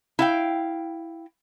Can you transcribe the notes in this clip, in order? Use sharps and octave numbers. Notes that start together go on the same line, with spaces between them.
E4 F5 G5